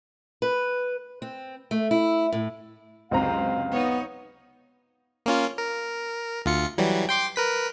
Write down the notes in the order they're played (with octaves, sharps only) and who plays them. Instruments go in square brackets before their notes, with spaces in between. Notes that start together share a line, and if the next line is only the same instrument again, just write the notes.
[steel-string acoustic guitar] B4
C4
A3
E4
A2
[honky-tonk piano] C#2 C4 A#5 [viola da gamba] F#2 C3 [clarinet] F5
[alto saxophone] B3 [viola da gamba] D#4 C#5
[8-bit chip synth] A#3 C#4 F4
A#4
D2 F4 C#7
E3 F#3 G3
G5 C6 D6
A#4 B4 B6